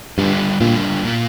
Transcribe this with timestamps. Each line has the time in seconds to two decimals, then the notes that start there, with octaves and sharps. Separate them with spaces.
0.18 G2 D3 G3 D4 F4
0.60 A#2 D3 G3 D4 F4
1.04 A#2 A#3 F4